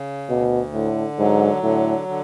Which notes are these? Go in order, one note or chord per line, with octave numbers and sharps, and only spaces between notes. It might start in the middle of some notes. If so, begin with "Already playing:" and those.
Already playing: C#3
D2 B2
A2 D3
G#2 F#3
A2 D3
D3